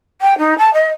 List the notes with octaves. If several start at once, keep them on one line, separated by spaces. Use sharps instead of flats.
G5
D#4
A5
D#5